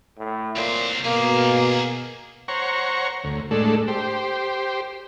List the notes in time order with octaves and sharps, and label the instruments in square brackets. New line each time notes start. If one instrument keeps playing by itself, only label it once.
[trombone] A2
[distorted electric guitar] C2 C5 [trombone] A#2
[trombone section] B2 [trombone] A#3 [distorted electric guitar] G#4 A#4
[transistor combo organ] C5 C#5 F#5 A#5 C#6
D2
A2 G#3 D4 A4
G4 C5